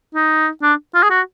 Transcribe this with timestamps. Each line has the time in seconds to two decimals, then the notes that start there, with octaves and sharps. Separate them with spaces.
0.15 D#4
0.62 D4
0.95 F4
1.03 G#4
1.10 F#4